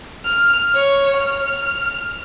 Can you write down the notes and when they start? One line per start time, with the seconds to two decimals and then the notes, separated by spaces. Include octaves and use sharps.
0.25 F6
0.74 C#5
1.18 F6